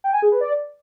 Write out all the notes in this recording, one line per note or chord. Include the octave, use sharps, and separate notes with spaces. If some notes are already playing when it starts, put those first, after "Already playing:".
G5
G#5
G#4
B4
D5